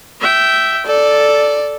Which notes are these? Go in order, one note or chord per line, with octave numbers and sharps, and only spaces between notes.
E5 G5
A4 D5